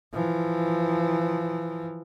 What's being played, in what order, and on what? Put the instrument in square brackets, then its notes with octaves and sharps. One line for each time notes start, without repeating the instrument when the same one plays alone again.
[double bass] E3 F3